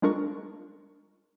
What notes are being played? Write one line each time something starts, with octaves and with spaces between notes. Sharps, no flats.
G3 G#3 D4 F4 A#4 C#6